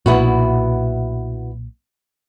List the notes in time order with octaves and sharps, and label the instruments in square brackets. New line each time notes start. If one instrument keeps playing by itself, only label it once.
[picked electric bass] B1 A#2 [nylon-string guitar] B3 E4 F#4